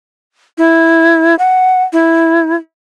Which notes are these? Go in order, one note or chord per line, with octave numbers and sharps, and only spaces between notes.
E4
F#5
E4